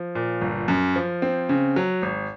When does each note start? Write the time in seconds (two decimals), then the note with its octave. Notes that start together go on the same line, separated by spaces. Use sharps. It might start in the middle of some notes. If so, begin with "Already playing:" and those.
Already playing: F3
0.15 A#2
0.41 G1
0.68 F#2
0.96 F3
1.22 C4
1.49 C#3
1.76 F#3
2.02 G#1